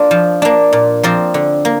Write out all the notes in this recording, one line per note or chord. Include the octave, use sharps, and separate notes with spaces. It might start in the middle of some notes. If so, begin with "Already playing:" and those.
Already playing: A#3 D4 F4
F3
A#3 D4
A#2
F3 C4 A#4 D5
D3
A#3